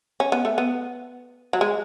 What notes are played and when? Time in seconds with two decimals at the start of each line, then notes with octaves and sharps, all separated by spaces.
0.20 C#4
0.32 B3
0.45 A3
0.58 B3
1.53 F#3
1.61 G#3